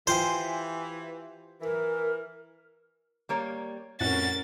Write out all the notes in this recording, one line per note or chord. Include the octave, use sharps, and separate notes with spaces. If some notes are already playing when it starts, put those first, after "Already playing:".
E3 F4 G4 C5 G#5
E3 A#4
G3 A#3 C#5
F2 A2 C#4 F#4 A#4 F#5 A6